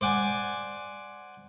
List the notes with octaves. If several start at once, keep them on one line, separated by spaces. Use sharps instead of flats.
C5 D5 F#5 G#5